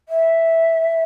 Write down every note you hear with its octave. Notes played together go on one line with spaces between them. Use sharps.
E5